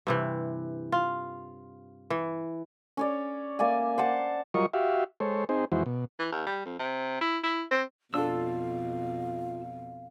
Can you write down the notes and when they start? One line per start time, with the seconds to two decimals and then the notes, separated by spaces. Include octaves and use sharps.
0.07 G2 C3 E3
0.92 F4
2.10 E3
2.97 C#4 C#5 D5
3.59 A#3 D5 E5 G#5
3.98 C5 F#5 A5
4.54 F#3 G3 F4 A#4 D#5 C#6
4.74 F#4 G4 E5 F5
5.20 G#3 A4 C5 C#5
5.49 C4 D#4 G#4 C5
5.72 F2 E3 G#3 E4 F#4 C5
5.86 B2
6.19 E3
6.32 D#2
6.47 G3
6.65 F2
6.79 C3
7.21 E4
7.43 E4
7.71 C4
8.14 F2 B2 D4 F4 A4 F5 E6